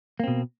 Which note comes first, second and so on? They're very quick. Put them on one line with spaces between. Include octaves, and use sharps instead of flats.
A#3 C4 B2